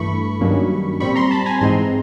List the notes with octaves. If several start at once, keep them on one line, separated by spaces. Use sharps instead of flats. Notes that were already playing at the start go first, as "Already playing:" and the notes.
Already playing: G2 E3 A3 B5 C#6
G2 D#3 F#3 A#3 C#4
A#2 G3 C4 B5 C#6
A#5 C6
A5 B5
G#5 A#5
G#2 E3 G#3 C4 A#5 C6